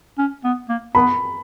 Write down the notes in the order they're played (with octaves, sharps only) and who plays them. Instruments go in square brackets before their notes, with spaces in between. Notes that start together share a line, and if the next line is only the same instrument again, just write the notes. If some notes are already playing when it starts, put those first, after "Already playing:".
[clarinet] C#4
B3
A#3
[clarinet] B3 [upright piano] B5